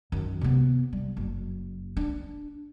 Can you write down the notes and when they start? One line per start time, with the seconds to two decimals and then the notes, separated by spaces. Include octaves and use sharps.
0.12 F#2 D#3
0.41 C3 B3
0.93 G3
1.17 F#1
1.97 D4